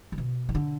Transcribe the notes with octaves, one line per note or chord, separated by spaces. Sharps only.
D3
B2
D#3
D3